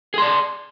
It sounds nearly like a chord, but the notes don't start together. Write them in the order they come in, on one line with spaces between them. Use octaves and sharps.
G#4 C6 D5